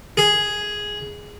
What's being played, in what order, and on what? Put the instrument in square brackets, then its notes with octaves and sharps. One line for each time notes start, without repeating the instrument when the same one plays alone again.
[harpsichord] G#4